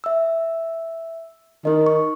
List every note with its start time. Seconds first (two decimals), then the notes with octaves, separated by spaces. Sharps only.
0.04 E5 E6
1.65 D#3 D#4 D#5
1.86 C#6